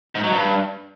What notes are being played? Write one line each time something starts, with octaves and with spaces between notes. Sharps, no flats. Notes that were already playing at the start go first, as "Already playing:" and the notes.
G#2
F#3
G2